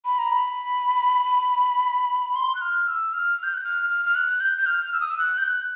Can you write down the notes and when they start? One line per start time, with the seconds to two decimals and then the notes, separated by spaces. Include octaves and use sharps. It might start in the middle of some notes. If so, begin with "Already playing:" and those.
0.05 B5
0.19 A#5
0.31 B5
2.36 C6
2.55 F#6
2.61 F6
2.87 E6
3.13 F6
3.43 G6
3.54 F#6
3.64 F6
3.90 F6
4.05 F6
4.15 F#6
4.40 G6
4.58 G6
4.66 F6
4.93 E6
5.00 D#6
5.09 E6
5.18 F#6
5.38 G6
5.44 F#6